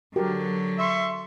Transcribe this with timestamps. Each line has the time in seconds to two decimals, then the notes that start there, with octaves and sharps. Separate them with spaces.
0.16 D3 F#3 F#4 G4 A#4
0.78 E5 C6 C#6